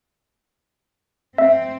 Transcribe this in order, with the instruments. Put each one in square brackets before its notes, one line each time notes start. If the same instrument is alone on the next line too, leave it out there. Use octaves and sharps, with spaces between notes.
[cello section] C4 [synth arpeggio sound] E5